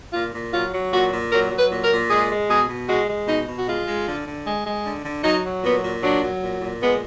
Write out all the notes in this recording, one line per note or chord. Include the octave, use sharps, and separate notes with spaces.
A#2 F4
A#2
F#3 F4
F#3
A#2 F#4
A#2
F#3 A#4
F#3
B4
A#2
A#4
A#2
G#3 G#4
G#3
B2 G#4
B2
G#3 F#4
G#3
B2 D#4
B2
F#4
G#3 F4
G#3
D3
D3
G#3
G#3
D3
D3
F#3 D#4
F#3
A#2 B3
A#2
F#3 D4
F#3
A#2
A#2
G#3 B3